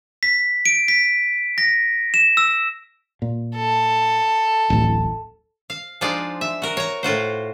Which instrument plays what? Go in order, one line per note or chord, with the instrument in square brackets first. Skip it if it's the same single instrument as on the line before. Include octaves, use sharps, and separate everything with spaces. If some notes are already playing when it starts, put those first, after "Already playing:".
[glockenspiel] B6
D7
B6
A#6
E7
E6
[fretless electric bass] A#2
[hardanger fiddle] A4
[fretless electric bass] D1 A1
[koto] F5
F3 G#3 D4 D#4 F4 D5
E5
F#4 A#4
C#5 A#5
A2 F4 F#4 C5